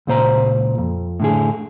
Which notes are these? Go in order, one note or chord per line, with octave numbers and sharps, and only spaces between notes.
C#2 A#2 C5 A#5
F2
A2 D3 G#4